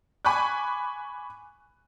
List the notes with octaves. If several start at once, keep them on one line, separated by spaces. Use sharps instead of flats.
G#5 B5 C#6 D6 F#6